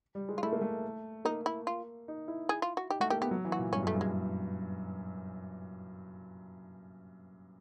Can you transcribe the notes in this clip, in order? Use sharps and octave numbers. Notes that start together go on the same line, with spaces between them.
G3
G#3
F4
A3 E4
A#3
A3
A#3 D#4
E4
F4
D#4
E4
E4 G#4
F4
F#4
D#4 G4
A3 F#4
A#3 G4
B3 G4
F#3
E3
F#4
A#2
G2 C#4
F#2
A3
G2
G#3